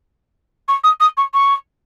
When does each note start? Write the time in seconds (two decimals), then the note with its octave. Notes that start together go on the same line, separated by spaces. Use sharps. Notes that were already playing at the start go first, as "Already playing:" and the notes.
0.68 C#6
0.84 D#6
1.00 D#6
1.17 C#6
1.34 C#6